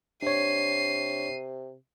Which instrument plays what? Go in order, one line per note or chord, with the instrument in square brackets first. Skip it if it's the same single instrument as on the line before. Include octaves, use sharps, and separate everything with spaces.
[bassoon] C3 [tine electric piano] D4 C#5 [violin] C7 D#7